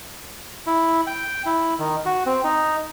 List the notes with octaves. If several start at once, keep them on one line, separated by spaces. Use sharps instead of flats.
E4
G5
E4
D#3
F#4
C4
D#4